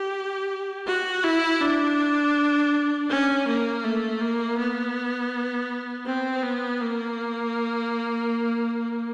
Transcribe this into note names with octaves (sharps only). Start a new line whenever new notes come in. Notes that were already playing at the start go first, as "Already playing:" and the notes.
Already playing: G4
F#4
E4
D4
C#4
A#3
A3
A#3
B3
C4
B3
A#3